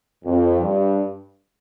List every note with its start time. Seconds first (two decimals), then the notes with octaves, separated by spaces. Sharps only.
0.25 F2
0.61 G2